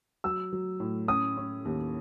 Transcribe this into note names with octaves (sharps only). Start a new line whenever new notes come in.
F#3 E6
F#3
A2
C#4 D#6
C#4
D#2